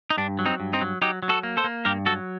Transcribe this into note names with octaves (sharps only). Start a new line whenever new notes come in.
D#4
G2 D4
F#3
C4 D#4
G2
C4 D#4
F#3
F#3 D#4 G4
F#3
F#4 A4
A#3
A4 C5
A#3
G2 G4 A#4
F#3 F#4 A4